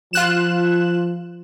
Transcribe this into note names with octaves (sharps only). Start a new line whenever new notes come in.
F3 F4 F#6 E7